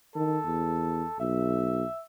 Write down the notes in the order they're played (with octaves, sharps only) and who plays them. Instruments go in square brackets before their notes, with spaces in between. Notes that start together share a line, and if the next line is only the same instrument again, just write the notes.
[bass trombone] D#3 [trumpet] A4
[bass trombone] E2
[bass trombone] B1 [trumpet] E5